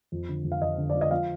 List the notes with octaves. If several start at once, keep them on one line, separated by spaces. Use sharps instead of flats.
F2
D3
F2
F5
F2 D#5
D3
F3 D5
D#5
F3 F5